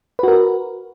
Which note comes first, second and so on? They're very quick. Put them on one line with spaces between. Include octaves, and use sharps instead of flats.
B4 F#4 A#4